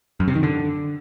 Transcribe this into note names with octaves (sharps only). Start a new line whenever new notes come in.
F#2
C3
D#3
D3